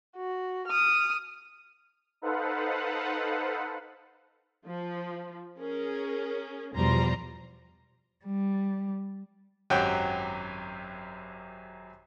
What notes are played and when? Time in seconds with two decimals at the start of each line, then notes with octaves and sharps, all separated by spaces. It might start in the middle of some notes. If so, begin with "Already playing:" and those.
0.16 F#4
0.67 D#6 F6
2.22 D#4 A4 B4 C5 F5 F#5
4.65 F3
5.59 C#4 G#4 A#4
6.75 E2 B2 F3 G3 A#5 C6
8.25 G3
9.70 G#1 F#2 F#3 G4 F#5 G5